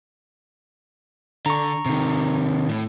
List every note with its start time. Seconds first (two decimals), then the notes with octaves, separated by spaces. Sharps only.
1.46 D3 A#5 C#6
1.86 C3 D#3
2.69 A2